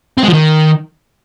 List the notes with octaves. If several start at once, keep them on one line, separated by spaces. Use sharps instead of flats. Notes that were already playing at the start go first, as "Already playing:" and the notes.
C4
G#3
F3
D#3